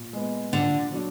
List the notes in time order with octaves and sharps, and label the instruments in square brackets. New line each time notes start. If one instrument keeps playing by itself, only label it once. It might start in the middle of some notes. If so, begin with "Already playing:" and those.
Already playing: [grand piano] A#2
G#3 B3
[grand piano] A#2 [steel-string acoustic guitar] D3
[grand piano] F#3 D4